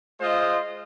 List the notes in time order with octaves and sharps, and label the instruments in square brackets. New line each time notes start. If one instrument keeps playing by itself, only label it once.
[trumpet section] G#3 F4 C5 D#5